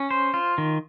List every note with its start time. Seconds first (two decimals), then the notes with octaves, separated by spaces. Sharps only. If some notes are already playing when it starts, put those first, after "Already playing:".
Already playing: C#4
0.11 C5
0.34 F4
0.58 D#3